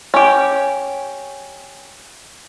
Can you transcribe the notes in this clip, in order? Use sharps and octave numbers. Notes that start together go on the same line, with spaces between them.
C#4 G4